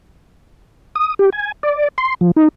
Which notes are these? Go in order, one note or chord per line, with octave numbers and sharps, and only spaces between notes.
D#6
G4
G#5
D5
C6
F3
D#4